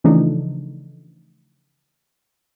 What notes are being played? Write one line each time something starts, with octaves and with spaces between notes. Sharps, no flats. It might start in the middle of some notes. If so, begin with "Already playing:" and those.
C#3 E3 F3 A3 D4 D#4